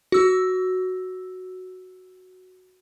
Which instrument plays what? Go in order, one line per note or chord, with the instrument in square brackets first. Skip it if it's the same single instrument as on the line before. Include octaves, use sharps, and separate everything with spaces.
[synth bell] F#4 E6